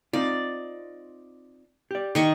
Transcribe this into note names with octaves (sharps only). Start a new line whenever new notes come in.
C4 D#4 F4 D5
G4 D5
D#3 D#5 C#6